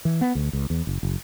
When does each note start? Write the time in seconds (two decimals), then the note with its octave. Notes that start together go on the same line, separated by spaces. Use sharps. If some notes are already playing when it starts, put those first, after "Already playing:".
0.05 E3
0.21 B3
0.35 D2
0.53 C#2
0.70 E2
0.87 F#1
1.03 F#1